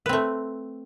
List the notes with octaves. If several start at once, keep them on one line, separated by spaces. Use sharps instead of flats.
A3 C4 B4